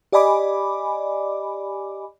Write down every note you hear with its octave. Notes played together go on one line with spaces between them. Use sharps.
G4 D5 D#5 G#5 B5 D6